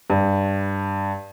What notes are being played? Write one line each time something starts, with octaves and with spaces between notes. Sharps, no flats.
G2